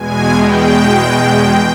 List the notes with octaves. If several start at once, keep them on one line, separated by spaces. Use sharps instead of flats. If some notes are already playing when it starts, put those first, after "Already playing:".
Already playing: E2 B2 G#3 G#5
G5